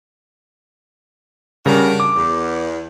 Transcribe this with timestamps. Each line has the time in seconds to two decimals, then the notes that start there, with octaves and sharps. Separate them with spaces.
1.66 C#3 G3 D4 F#4 A#4
2.00 D6
2.15 E2